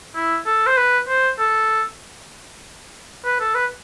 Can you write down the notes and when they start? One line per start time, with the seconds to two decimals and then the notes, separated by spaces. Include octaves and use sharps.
0.16 E4
0.46 A4
0.66 C5
0.77 B4
1.08 C5
1.39 A4
3.25 B4
3.40 A4
3.55 B4